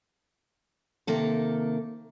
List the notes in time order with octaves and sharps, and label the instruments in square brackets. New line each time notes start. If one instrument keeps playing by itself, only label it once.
[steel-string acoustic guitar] C3 D#3 A#3 A4